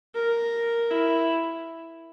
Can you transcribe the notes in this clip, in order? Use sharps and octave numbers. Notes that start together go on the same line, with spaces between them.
A#4
E4